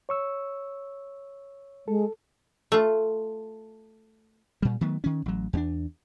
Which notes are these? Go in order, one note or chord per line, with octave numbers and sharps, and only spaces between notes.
C#5 C#6 E6
G#3 A4
A3 F4
A#2 G3
D#3 F#3 A3 B3
D#3 C#4
A1 F#3
E2 A#3 D4